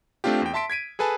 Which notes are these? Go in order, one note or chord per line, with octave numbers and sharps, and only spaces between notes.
A3 C4 D4 F4 G4
E2 G5
E5 A5 C6 B6 D7
G#6 B6 D7 D#7
G#4 A4 B4 G#5 A5